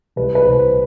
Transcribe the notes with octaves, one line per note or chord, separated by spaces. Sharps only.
C2 B4
B4
C2 C5